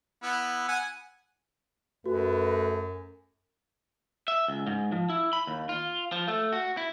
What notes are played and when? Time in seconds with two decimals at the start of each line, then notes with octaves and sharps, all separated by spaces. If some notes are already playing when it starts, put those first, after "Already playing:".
0.23 B3 E4
0.68 F#5 G#5
2.06 F#2 A3 F#4 B4
4.28 E5
4.48 C#2
4.67 G#2
4.92 F3
5.10 E4
5.33 B5
5.47 D#2
5.69 F4
6.12 F3
6.28 A3
6.53 F#4
6.77 E4